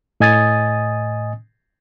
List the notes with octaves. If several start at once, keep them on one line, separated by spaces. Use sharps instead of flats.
A2 D#5 G#5 D#6 A6